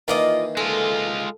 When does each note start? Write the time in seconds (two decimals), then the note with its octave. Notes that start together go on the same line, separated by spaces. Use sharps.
0.08 D#3 E3 A#3 F4 D5 D#5
0.57 G#3 F4 A4